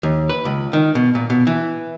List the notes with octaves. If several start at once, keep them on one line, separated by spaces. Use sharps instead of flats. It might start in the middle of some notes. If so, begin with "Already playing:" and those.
D#2
B4
C#2
D#3
B2
A#2
B2
E3